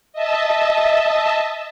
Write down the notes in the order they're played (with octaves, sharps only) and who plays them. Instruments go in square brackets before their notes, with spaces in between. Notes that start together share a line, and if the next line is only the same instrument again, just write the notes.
[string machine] D#5 E5 A5